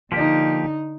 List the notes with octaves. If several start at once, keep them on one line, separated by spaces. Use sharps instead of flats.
D3 F3 A#3 D#4 G4